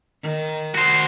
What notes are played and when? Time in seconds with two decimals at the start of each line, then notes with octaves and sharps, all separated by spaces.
0.22 D#3
0.75 F#4 C5